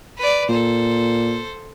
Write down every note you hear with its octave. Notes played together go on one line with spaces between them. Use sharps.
B4 D5
A#2 A4 C5